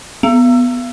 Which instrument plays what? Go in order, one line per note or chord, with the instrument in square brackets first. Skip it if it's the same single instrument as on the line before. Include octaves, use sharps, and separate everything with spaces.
[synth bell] B3